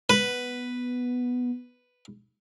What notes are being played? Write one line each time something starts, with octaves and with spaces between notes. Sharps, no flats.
B3 B4